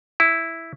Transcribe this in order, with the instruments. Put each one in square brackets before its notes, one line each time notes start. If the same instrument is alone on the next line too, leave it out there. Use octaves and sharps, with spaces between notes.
[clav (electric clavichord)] E4